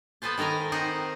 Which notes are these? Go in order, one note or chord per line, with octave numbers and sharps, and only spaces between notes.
B3 A4 B4 C5 A5
D#3 A4 A#4 G#5 A#5
C4 D#4 F#5